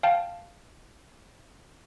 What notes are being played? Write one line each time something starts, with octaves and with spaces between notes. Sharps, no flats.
F5 G5 A5